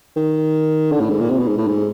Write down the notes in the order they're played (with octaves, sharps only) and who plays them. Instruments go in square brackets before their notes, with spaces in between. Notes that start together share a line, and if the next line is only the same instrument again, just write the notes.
[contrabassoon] D#3
D3
A2
G#2
A#2
C3
B2
G#2
A2
G#2